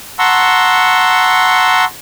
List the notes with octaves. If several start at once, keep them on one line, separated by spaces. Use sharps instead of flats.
F#5 A5 A#5 C6 C#6 E6